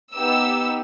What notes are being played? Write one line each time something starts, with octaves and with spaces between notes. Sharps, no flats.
B3 D#4 G4 E6